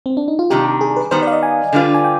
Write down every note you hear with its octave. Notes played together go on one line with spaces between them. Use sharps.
C4
D4
D#4
F4
C3 D#3 G3 D4 G4
G#4
B4
D#3 G3 B3 C5
D5
F5
D#5
G#5
D3 G3 D4 F4 B4
G#5
G5